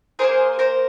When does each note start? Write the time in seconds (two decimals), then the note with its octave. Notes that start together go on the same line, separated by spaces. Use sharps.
0.19 A#3 D#4 G#4 A#4 C5
0.59 A#4 C5